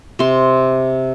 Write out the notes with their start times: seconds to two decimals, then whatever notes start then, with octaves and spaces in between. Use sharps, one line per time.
0.19 C3 C6